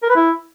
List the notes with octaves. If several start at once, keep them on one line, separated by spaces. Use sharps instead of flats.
A#4
B4
E4